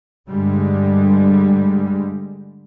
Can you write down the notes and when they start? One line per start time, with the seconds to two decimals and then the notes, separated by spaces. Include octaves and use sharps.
0.29 G2 D3 G3 G#3